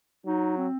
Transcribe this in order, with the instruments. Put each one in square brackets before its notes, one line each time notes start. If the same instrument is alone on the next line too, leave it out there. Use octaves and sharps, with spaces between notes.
[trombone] F#3 [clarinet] D#4
[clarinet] C4